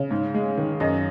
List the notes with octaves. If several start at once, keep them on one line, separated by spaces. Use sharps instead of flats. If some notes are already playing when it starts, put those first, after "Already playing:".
Already playing: C#3
G#2
G#3
D#3
F#2 D#5